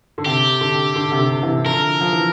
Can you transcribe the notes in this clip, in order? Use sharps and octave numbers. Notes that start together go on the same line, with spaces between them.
D3
C3 G4
D3
D3
C3
D3
C3 E3
D3 F3 A#4
F3
E3